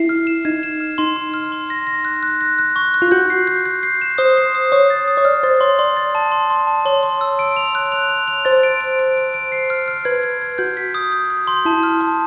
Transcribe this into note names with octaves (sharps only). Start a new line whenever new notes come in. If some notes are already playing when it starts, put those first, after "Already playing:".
Already playing: E4 C7
F6
E7
D#4 G#6
E7
F6
D#4 C6
C6
F6
C6
A#6
A#6
F#6
F#6
A#6
F#6
C#6
F#6
F4
F#4 G6
C7
G6
G6
C7
E7
C5 D#6
C7
D#6
C#5 D#6
A6
D#6
C#5
D5 F6
C5 A6
C#5 C6
D5 C6
A6
A5
C6
C6
A5
C#5 C6
C6
E6
D7
F7
F#6
F7
F7
F7
C5 A6
D7
D7
D7
D7
D7
C7
F6
F6
B4 G#6
G#6
G#6
F#4 G6
B6
D#6
G6
G6
C6
E4 A5
F6
A5